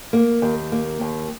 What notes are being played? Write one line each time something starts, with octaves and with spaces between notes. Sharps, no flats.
A#3
D#2
A#3
D#2